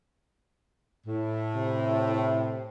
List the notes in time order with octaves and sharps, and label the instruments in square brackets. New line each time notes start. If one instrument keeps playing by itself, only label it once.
[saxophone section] A2
[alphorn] C3